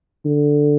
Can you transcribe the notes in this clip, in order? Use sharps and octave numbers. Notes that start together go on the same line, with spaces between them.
D3